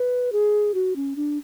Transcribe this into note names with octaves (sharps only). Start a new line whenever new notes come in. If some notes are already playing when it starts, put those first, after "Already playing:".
Already playing: B4
G#4
F#4
C#4
D4